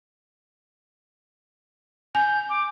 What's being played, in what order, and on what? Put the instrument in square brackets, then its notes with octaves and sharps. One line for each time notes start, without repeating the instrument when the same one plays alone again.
[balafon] G#5 [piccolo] G6
[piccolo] D6